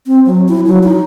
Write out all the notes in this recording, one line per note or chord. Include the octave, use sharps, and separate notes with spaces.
C4
F#3
E4
F#3
D#4